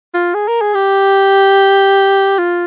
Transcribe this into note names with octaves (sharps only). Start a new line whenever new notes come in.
F4
G#4
A#4
G#4
G4
F4